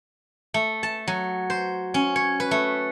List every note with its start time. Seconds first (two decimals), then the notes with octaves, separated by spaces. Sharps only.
0.54 A3
0.83 A5
1.07 F#3
1.50 C5
1.94 C#4
2.16 C#5
2.40 B4
2.51 A3